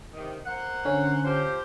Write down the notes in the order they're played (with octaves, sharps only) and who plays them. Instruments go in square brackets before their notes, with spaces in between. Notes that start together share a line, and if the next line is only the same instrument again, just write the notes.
[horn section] C3 D#3
A#3 C5 F#5
[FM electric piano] D3 C#4
[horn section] F3 G4 C5